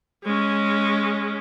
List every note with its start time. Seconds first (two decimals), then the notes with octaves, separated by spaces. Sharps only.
0.24 G#3 C#4